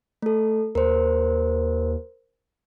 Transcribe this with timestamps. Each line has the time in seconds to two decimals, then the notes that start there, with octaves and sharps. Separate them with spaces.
0.22 A3 A4
0.75 D#2 A#4 C5